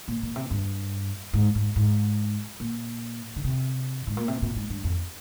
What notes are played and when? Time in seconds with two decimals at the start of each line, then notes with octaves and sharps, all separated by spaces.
0.08 A#2
0.23 A#2
0.36 C3
0.51 G2
1.33 G#2
1.55 G#2
1.76 G#2
2.60 A#2
3.36 D3
3.44 C3
4.07 G#2
4.17 A#2
4.28 C3
4.42 A#2
4.56 G#2
4.70 G2
4.84 F2